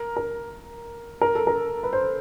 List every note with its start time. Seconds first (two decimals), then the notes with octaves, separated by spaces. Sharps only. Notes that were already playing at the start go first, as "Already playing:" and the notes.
Already playing: A#4
0.17 A#4
1.21 A#4
1.35 A4
1.47 A#4
1.83 B4
1.93 C5